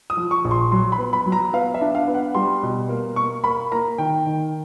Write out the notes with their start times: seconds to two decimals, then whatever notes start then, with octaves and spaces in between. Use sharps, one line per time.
0.10 D#6
0.17 F3
0.31 C#6
0.45 A#1
0.51 C6
0.72 F#3 C6
0.92 B5
0.98 B3
1.13 B5
1.26 F#3
1.32 A#5
1.53 B3 F5
1.74 E5
1.81 D4
1.95 F5
2.08 B3
2.15 F#5
2.34 G3 C6
2.63 B2
2.89 A#3
3.16 A#3 C#6
3.44 A#3 B5
3.71 A#3 A#5
3.98 D#3 G5
4.26 D#3